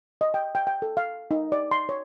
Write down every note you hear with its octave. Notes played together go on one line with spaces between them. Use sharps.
D#5
G5
G5
G5
A4
F5
D#4
D5
C6
C#5